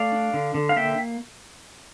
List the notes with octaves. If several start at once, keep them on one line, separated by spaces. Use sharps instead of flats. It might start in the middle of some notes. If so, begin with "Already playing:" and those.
Already playing: A3 D5 F5
D4
D3
D3
F5
A#3 E5 G5